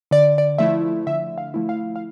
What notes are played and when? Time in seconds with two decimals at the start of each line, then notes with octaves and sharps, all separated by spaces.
0.11 D3 D5
0.38 D5
0.58 F3 A3 E4 E5
1.07 D3 E5
1.38 F5
1.54 F3 A3 E4
1.69 F5
1.96 F5